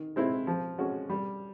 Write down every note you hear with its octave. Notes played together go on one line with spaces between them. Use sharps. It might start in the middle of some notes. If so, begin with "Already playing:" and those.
Already playing: D#3
G#3 C4 E4
F3
G#3 C#4 F#4
G3